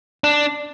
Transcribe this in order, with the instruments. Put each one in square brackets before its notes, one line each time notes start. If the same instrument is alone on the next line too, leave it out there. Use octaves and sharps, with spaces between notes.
[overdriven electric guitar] D4